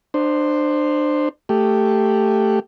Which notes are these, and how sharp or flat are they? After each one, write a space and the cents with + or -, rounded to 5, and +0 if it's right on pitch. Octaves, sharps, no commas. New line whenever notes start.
D4 +30 C5 +0
A3 +5 G4 +0